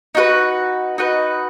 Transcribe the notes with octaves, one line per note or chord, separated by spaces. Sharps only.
D#4 F#4 B4
D#4 F#4 B4